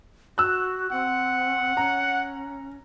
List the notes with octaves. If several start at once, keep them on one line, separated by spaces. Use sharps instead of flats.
F#4 E6 F#6
C4 F#5
C#4 A#5